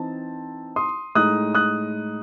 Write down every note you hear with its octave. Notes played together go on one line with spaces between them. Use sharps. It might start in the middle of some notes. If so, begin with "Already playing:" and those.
Already playing: E3 C4 D#4 A5
C6 D#6
A2 G#3 D#4 D#6 F#6
D#6 F#6